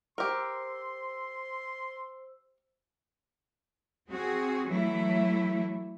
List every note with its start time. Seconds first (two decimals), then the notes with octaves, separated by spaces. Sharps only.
0.18 G4 A#4 C5 C6 E6
4.09 C4 F#4 G#4
4.67 E3 F#3 A3 E4